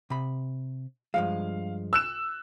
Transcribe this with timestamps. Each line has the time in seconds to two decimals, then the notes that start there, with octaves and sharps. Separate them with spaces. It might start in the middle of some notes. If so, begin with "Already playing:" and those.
0.10 C3 B5
1.14 G2 F3 G#3 F5
1.93 E6 F#6 E7